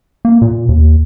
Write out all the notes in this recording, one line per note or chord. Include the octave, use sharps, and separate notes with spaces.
A#3
A#2
D#2